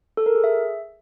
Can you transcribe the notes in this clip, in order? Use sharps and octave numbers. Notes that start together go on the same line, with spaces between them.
A4
A#4
G#4
E5